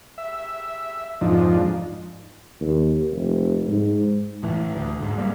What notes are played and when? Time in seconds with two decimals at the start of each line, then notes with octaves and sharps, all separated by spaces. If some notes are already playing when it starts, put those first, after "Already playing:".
0.18 E5
1.21 F2 G#2 F3 D4 D#4
2.61 D#2
3.11 F1
3.67 G#2
4.43 A2 E3
4.76 D2
5.01 G#2
5.18 G3 A#3